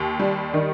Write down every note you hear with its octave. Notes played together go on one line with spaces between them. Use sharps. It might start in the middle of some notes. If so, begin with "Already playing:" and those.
Already playing: D#2
G3
D#3